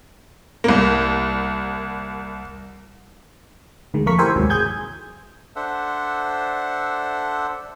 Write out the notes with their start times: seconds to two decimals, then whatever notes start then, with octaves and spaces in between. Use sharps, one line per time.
0.64 C2 A#3
3.94 D2 D#3 G#3
4.06 F2 A3 A#3 A#4 C#6 B6
4.19 E4 G4 A#4 C5 E5 G#5
4.36 D#2 G#2 C3 F#3
4.50 G#4 G#5 G6 G#6
5.56 D4 A4 C5 E5 F#5